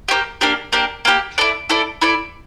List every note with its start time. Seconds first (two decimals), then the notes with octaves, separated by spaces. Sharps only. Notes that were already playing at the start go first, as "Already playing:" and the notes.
0.08 A#3 D4 G4
0.41 A#3 D4 G4
0.72 A#3 D4 G4
1.05 A#3 D4 G4
1.38 E4 A4 D5
1.69 E4 A4 D5
2.02 E4 A4 D5